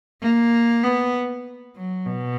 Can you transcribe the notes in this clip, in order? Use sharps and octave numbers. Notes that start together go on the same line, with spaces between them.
A#3
B3
F#3
B2